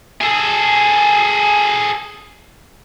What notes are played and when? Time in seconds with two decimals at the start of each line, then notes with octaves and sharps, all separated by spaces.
0.21 G#4 A4